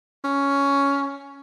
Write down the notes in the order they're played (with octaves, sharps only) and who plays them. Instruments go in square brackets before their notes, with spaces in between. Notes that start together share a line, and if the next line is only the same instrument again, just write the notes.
[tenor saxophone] C#4